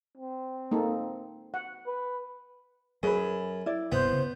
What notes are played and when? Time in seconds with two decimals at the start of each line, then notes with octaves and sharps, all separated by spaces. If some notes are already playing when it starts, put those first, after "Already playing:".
0.18 C4
0.71 A#3 D#4 A4
1.54 F#5
1.86 B4
3.03 F#2 F#3 G#4 B4
3.66 E4 D5
3.92 D1 G2 C3 B3 C5
4.12 C#3